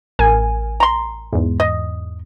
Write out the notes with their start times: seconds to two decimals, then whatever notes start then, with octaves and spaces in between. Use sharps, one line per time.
0.19 A1 A#4 G#5
0.80 A#5 C6
1.33 E2 G#2
1.60 D#5